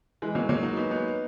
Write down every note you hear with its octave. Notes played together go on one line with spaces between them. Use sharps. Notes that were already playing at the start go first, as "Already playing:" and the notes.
E3 G#3
F#3 A#3
F#3 A#3
D#4 F#4
B3 D#4
B3 D#4